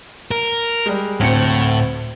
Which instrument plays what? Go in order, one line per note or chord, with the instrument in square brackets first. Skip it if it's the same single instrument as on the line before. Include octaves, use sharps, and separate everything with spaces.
[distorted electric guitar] A#4
[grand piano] G3 G#3
[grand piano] D2 C4 C#7 [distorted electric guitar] A2